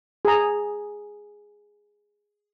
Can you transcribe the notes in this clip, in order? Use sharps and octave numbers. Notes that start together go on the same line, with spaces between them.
G#4 A#5